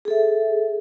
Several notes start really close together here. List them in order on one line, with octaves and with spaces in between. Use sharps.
G#4 A4 E5